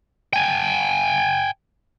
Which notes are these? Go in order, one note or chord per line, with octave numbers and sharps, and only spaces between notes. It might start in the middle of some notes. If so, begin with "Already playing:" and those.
G5 G#5